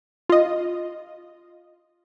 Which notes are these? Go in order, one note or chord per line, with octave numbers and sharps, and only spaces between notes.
F4 D#5